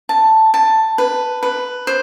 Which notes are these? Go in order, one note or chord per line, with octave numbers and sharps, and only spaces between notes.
A5
A5
B4
B4
C5